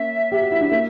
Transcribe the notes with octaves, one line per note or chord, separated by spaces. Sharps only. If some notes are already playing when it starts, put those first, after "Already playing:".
Already playing: A#3 C#4 E5
G4
F#4
E4
D4
A#3 C#4